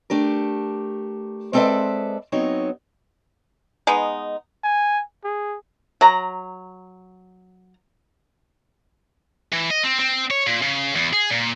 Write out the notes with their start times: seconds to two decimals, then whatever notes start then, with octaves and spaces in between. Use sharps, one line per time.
0.10 A3 D4 G4 A#4
1.53 G#3 C4 A4 B4 D5 E5
2.32 F#3 B3 C4 D#4 C#5
3.87 G#3 B3 D#4
4.63 G#5
5.24 G#4
6.01 F#3 A#5
9.52 E3
9.70 D#5
9.83 C4
9.99 C4
10.31 C#5
10.47 A#2
10.62 C#3
10.95 E2
11.13 G#4
11.30 A#2